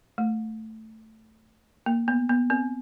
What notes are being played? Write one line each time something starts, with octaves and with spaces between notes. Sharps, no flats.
A3
A#3
B3
B3
C4